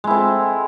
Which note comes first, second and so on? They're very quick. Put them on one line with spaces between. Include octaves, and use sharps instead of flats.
G#3 E4 C4 A4